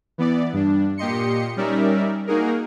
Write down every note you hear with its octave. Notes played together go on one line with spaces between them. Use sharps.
E3 B3 D5
G2 D4
A#2 G4 D#5 C6 C#7
G3 C#4 D#4 A#4 D5 E5
A#3 D#4 F#4 G#4 A#4